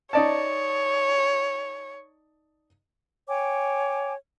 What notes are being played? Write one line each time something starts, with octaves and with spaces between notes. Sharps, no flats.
D#4 C#5 D5 A5
C#5 G5 G#5 D6